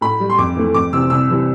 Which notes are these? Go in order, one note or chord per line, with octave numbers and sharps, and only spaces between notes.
A2 B5
G3
C6
F2 D6
E3 A3
F2 D6
C3 E3 E6
C2 E6
C3 E3 G3